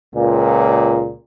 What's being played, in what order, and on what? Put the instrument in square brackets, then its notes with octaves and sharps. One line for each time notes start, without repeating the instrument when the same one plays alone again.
[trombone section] C#2 A#2